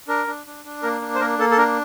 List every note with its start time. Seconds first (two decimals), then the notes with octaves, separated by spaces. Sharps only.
0.08 D4 A#4
0.27 D4
0.46 D4
0.65 D4
0.83 A#3 A#4
1.01 D4
1.15 C5
1.20 A#3 A#4
1.39 A#3 A4
1.51 A4
1.58 D4 A#4